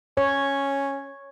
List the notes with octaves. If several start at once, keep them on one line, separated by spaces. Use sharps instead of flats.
C#4 C#5